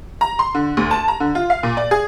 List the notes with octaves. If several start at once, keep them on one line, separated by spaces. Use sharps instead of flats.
A#5
C6
D3
D2
A5
A#5
D3
F4
F5
A#2
D5
G#4